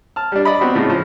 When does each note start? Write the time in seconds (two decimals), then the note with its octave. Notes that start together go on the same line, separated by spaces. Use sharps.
0.16 A5 F6
0.32 G3 D4
0.45 D5 D#5 B5
0.61 B3 C4 F#4
0.75 A2 C#3 F4
0.90 F3